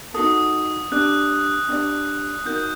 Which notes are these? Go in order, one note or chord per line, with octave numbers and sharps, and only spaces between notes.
D#4 F#4 A4 D#6
D4 G4 D5 F#6
D4 G4 D5
D#4 F#4 A#4 G6